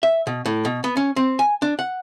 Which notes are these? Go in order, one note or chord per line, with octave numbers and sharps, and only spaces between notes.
E5
B2
A2
B2
B3
C#4
C4
G#5
D4
F#5